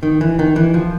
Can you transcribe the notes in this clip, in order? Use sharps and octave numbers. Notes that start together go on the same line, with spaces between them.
D#3
E3
D#3
E3
F3